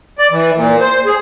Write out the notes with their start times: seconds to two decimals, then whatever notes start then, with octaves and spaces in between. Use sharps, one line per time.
0.19 D5
0.31 E3
0.55 A#2
0.81 C5
1.06 G#4